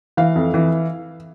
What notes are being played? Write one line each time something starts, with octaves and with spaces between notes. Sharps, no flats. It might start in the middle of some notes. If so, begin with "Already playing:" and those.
E3 F5
F2
E3